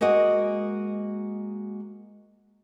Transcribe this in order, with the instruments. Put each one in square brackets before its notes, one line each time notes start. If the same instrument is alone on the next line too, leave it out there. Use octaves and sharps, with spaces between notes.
[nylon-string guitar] G#3 A#3 F#4 D#5 F#5